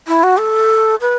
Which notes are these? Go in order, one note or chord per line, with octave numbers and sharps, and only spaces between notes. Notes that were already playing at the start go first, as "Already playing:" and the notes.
E4
F#4
A4
B4